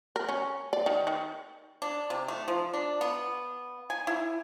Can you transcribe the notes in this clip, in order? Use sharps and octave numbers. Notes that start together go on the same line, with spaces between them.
A#4
C#4
D5
D#3
D#3
D4
C3
A3
F3
D4
B3
G#5
E4